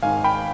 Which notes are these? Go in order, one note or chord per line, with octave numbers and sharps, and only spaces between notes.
G#1 G#2 D#3 F5 G#5
G5 B5